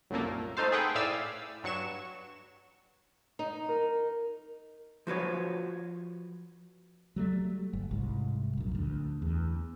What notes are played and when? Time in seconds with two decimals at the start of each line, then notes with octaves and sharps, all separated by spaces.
0.10 C2 F#2 A#2 A3 A#3
0.57 A3 D#4 A4 C5 F5
0.72 G#4 A4 B4 F#5 G5
0.95 A2 D5 E5 F5 G#5 E6
1.63 G2 F#3 C#6 E7
3.39 D#4
3.69 A#4
5.07 F3 F#4 B4 C#5
7.16 F#3 G3 A3
7.73 G1
7.91 C2 G#2
8.58 A#1 F#2
8.75 D2
9.22 E2